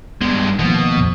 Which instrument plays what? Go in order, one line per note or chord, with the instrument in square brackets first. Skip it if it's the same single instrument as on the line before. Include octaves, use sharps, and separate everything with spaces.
[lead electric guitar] G2 G#3 [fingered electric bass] B3
[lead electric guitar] B2 [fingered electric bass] D#3 F3 A#3
[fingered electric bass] F2 A#2 F3